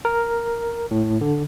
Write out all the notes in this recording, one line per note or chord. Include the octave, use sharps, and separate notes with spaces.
A#4
A2
D3